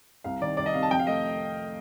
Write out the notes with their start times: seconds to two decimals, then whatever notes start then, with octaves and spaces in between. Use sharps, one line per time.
0.24 C2 F5
0.42 D#3 D5
0.57 C2 D5
0.66 D#5
0.74 C3 F5
0.82 A5
0.91 F2 G5
0.99 F5
1.07 A3 D#5